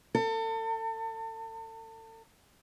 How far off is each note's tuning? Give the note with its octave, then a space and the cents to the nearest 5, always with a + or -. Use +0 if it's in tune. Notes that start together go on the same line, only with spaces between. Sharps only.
A4 +35